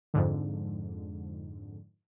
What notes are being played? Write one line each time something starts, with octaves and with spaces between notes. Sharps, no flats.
F2 G#2 D3